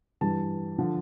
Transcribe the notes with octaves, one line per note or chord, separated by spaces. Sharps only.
G2 E3 G3 A5
D3 F3